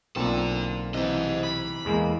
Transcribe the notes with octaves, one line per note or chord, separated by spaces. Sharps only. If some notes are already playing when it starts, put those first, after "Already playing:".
B1 A#3 C4 F4 A4 D5
C3 E3 C5 D#5
B5
E2 G#3 A#3